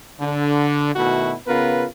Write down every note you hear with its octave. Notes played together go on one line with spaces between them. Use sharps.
D3
B2 D#3 A3 E4 F#4
C#3 B3 F4 A#4 B4